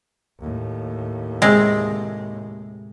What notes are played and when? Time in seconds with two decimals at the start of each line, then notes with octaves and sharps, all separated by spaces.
0.40 D#2 A2
1.42 C3 G#3